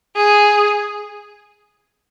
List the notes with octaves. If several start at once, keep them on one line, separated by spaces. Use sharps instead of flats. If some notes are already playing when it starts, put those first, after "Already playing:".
G#4